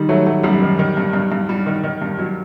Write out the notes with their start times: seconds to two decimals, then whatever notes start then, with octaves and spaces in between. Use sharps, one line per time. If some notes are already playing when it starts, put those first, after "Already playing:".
Already playing: D#3 G3
0.09 F#3 A3
0.26 F#3 A3
0.43 F#2 G3
0.62 D#3
0.79 D#3
0.97 G2
1.13 G2
1.32 G2
1.49 G3
1.66 D#3
1.84 D#3
2.02 G2
2.19 F#3